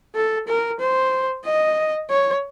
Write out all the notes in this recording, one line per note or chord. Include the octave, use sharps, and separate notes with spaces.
A4
A#4
C5
D#5
C#5